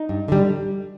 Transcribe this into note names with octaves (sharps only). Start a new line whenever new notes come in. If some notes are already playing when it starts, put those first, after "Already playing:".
Already playing: D#4
G2
D3 G3